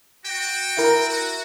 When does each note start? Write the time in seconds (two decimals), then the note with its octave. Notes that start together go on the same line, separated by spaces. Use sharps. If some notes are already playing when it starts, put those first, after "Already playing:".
0.24 F#4 G5
0.77 E4 A#4
1.07 F#4